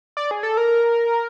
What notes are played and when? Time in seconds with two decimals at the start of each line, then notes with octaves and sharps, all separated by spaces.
0.17 D5
0.31 G#4
0.43 A4
0.57 A#4